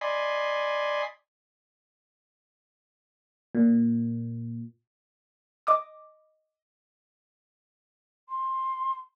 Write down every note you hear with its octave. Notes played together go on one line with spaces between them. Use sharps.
D5 D#5 G#5 B5 C6
A#2
D#5 D6 D#6
C6